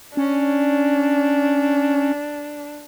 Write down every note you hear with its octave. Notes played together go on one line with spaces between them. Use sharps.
C#4 D4